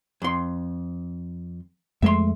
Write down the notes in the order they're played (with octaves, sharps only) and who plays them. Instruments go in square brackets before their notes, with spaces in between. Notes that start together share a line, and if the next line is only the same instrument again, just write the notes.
[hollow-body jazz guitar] F2 C6
[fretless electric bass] F2 G#3 A3 [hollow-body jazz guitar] E5 C6